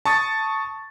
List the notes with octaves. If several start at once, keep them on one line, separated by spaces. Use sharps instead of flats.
A5 C#6 D#6 A6